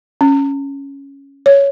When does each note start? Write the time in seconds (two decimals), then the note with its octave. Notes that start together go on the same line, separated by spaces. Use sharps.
0.21 C#4
1.46 C#5